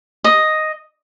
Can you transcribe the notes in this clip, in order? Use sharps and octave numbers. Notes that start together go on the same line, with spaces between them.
D#5